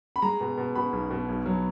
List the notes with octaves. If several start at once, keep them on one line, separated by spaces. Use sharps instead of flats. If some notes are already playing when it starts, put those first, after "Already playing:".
B5
G#3 A#5
B2
B2
B2 B5
B1
B2
B1
F#3